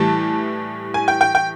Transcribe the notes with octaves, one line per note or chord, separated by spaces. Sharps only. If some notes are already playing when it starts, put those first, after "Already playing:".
Already playing: A2 E3 G3 A5
G#5
G5
G5
G5